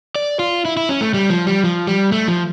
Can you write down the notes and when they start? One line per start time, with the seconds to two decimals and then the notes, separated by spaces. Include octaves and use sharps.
0.16 D5
0.39 F4
0.65 E4
0.77 E4
0.89 C#4
1.01 A3
1.14 G3
1.30 F3
1.47 G3
1.64 F3
1.87 G3
2.12 A3
2.28 F3